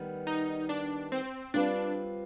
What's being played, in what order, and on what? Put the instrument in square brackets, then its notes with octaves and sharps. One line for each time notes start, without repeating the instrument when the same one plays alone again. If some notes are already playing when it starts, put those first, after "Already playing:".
Already playing: [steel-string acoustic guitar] D#3 G3 B3
[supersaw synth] D#4
D4
C4
[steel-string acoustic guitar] G3 C4 F4 B4 [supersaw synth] D4